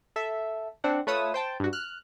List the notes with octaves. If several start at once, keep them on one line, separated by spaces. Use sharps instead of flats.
A4 E5
C4 D4 F#5
A3 F4 B4 C#5 D#6 E6
C5 G5 A5
G2 F#4
F6 F#6